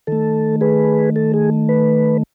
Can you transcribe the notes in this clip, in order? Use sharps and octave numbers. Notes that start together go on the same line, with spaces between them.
D#3 A3 A4
G#4 B4
A4
G#4
B4